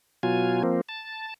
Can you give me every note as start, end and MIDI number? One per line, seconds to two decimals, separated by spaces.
0.23 0.63 47
0.23 0.63 54
0.23 0.63 65
0.23 0.63 80
0.63 0.81 53
0.63 0.81 58
0.63 0.81 60
0.89 1.34 81